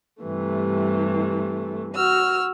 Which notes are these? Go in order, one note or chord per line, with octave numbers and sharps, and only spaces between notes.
G2 C3 E3 A3
F#4 E6 F6